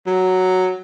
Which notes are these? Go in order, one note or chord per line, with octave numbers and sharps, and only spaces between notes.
F#3